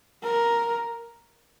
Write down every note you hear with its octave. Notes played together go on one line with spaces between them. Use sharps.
A#4